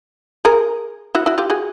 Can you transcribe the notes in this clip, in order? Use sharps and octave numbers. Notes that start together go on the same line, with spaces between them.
G#4 A#4
E4 F#4
E4 F#4
F4 G4
F#4 G#4